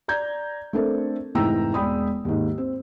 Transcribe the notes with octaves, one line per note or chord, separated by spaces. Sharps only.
D5 A#5 G6 G#6
A3 C4 D4 A4 A#4
F1 G#2 E3 G5 A#5 E6
E1 G#3 D5 G5 B5 D#6
D#2 G#2
C4